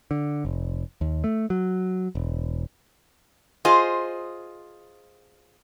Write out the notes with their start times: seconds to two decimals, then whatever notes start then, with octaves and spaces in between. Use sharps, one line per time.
0.11 D3
0.45 F1
1.01 D#2
1.24 A3
1.50 F#3
2.15 E1
3.65 F4 G#4 C5 D#5